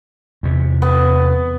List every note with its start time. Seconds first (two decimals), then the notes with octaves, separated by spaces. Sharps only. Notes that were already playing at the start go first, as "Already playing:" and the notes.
0.43 E2 C3
0.82 B3